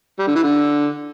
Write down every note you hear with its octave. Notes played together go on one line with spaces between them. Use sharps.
G3
D3
E3
D3